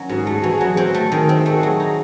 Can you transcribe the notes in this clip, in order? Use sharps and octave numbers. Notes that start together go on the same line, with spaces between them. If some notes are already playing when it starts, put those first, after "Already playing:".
Already playing: D#3 F#3 C#4
G#2 F#4
G#4
A3 F#4
G#4
E3 F#4
G#4
F#3 F#4
G#4
C4 F#4
A3
D#3 G#4
C4
A4
A3 G#4
F#4
F#3 G#4
D#4